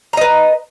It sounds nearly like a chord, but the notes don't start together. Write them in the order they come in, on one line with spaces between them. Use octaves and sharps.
A#5 D#5 B4